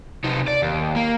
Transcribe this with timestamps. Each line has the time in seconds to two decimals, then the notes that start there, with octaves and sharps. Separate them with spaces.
0.24 C3 D#4
0.48 D5
0.62 D#2
0.96 A#3